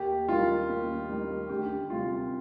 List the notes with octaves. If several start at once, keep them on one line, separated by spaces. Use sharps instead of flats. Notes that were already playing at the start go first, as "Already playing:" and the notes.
Already playing: D#2 G4
D#3 G3 F4
D#2
D#3 G3
D2 G4
C3 G3 F4